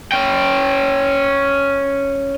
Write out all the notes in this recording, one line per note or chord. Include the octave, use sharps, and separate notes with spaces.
C#4 G5